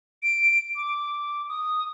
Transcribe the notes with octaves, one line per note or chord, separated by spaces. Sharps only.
D7
D6
D#6